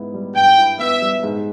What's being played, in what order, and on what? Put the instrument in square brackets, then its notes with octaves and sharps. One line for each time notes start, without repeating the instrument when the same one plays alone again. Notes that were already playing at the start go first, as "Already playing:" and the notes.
Already playing: [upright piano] G#2 B3 E4
G3
[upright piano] G2 [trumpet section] G5
[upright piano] E4
[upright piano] B3 [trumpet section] E5
[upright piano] G3
G#2